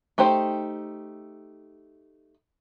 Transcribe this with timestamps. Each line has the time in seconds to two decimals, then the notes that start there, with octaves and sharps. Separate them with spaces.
0.18 A3 D#4 G4 C5 G5